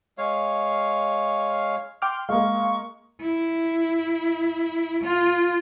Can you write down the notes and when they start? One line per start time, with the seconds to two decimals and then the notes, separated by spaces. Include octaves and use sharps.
0.18 G#3 C#5 F5
2.02 G5 C6 D6 F6
2.29 G#3 A#3 F5 C#6
3.21 E4
5.03 F4